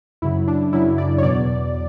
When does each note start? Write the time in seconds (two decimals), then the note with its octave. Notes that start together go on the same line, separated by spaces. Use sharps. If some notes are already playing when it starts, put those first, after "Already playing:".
0.22 F#2 C#3 F#3 E4
0.48 D4
0.72 F#2 C#3 F#3 E4
0.98 D5
1.18 C#5
1.23 E2 B2 F#3 D5